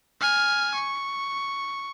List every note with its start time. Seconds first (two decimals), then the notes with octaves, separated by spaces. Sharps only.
0.21 G#5 F6
0.75 C#6